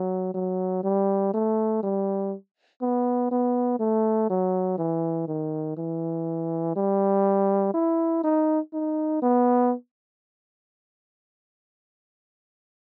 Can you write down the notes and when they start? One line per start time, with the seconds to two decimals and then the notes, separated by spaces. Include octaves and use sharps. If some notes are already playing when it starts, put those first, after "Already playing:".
Already playing: F#3
0.34 F#3
0.83 G3
1.33 A3
1.83 G3
2.81 B3
3.31 B3
3.79 A3
4.30 F#3
4.78 E3
5.28 D#3
5.77 E3
6.76 G3
7.74 E4
8.24 D#4
8.73 D#4
9.22 B3